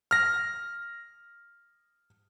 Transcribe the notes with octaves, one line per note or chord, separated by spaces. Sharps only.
F6 A#6